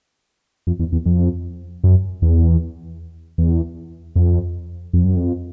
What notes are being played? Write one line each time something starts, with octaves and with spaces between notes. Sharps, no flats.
F2
E2
E2
F2
F#2
E2
E2
F2
F2
F#2
F2